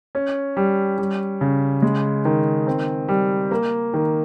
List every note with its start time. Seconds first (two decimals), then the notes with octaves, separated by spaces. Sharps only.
0.15 C#4
0.57 G3
0.98 G3
1.41 C#3
1.82 G#3
2.25 D#3
2.67 C4
3.08 G3
3.51 A#3
3.94 D#3